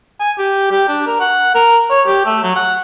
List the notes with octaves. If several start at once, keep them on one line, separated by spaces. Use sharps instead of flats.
G#5
G4
G4
D4
A#4
F#5
A#4
C#5
G4
A3
F#3
F#5